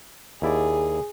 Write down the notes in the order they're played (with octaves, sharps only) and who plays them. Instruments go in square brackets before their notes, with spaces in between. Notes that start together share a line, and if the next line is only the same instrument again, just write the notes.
[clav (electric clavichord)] D#2 E4 D5 [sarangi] G#4